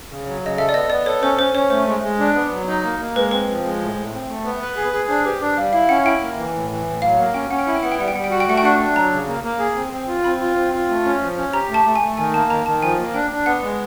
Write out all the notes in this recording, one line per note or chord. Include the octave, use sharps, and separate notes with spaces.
C#3
F#3
C#3 D#5
A4 E5
D5
B3 D#5
B3 D5
A4 C#5
C#4 C5
C#4 C5
C#4 C#5
A3 C5
G#3
G#3
D4
B3
F#3
D#4
A#3
A#3
G#3 B4
C4 B4
F3
G#3
A2
A2
C4
A3
B3
B4
G#4
G#4
D4 C5
G4 B4
D4 D5
G3 F5
E4 F5
C#4 F#5
E4 G5
A#3
E3
A2
E3
A2
F#3 F5
A#3 F#5
C#4 G5
C#4 F#5
G5
E4 F#5
G5
B3 F#5
G5
G3 F#5
G5
G3 F#5
G5
F#4 F#5
G5
A3 F#5
G5
D4 F#5
D4
F#3 A#5
C#3
A#3
A#3
G#4
C4
C4
F4
C4 B5
F4
C4
F4
A3
C#4
F3
C#4
G4 A#5
A3
A5
A3
G#5
A3
D#3 G#5
A#3 A5
D#3 A#5
D#3 A5
F3 G#5
A#3
D4 G5
D4
B3 F#5
G#3